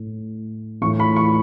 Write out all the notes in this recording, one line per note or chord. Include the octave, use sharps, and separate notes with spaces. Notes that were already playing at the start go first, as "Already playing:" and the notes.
Already playing: A2
A2 E3 C#6
B5
C#6